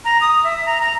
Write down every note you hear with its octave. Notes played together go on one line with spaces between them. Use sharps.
A#5
D#6
E5
A#5
A#5